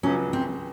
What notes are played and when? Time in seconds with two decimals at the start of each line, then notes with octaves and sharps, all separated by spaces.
0.03 C#2 C#3 F#3 C#4
0.33 C4